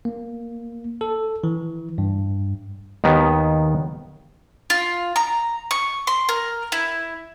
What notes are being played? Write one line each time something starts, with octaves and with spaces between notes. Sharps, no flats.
A#3
A4
E3
G2
D#2 D#3 B3
F4
A#5
C#6
C6
A#4
E4